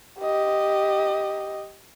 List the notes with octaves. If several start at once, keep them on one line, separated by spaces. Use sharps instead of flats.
G4 D#5